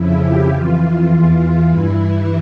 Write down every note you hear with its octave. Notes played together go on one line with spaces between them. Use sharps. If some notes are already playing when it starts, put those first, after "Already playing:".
Already playing: F2 C#3 F3 E4
G4
F2 E3 F4
E2 E3
G2 E3 E4
E4